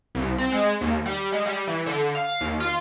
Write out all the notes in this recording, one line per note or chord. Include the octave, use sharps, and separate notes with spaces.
C2
C4
G#3
D#2
G3
G#3
G3
E3
D3
F5
D#2
F4